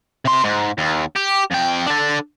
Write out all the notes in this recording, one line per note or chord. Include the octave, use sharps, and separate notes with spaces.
C3 C6
G#2
D#2
G4
F2 G5
D4 A4